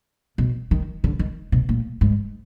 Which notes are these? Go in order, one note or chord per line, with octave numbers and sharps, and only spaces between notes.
B2
D#3
D3
D#3
B2
A#2
G#2